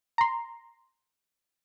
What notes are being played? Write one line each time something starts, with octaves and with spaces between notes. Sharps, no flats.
A#5 C6